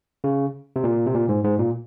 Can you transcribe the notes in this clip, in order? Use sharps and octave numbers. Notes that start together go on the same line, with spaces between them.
C#3
C3
A#2
C3
A#2
G#2
G#2
A#2